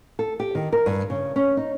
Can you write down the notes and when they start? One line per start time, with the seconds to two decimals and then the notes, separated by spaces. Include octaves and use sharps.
0.19 A4
0.40 G4
0.55 D#3
0.72 A#4
0.86 G2
1.10 C#3
1.36 C#4
1.57 D#4